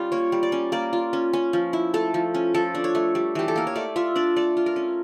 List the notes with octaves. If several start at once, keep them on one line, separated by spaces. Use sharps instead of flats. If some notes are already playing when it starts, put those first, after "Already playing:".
Already playing: G3 C#4 F4
A#3 C#5
G3
D5
C#4
A#3 D5
F4
C#4
C#4
F3
E4
A3 A4
F3
C#4
F3 A4
D4
C#5
A3
G3
E3 G4
A4
A#3 A#4
C#5
A3 D5
F4 E5
D4 D5
A3 D5
F4
A#4
C#4